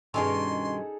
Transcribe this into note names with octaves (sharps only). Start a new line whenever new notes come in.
G2 B2 D#3 C#4 D#4 G#4 A4 C6